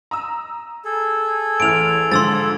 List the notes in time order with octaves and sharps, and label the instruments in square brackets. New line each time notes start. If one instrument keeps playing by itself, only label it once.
[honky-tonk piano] A#5 D#6 E6
[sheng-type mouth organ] G#4 A4
[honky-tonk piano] A1 E3 F6 [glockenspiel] D7 F7
[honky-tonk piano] G#2 D3 F3 [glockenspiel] C6 E6 A6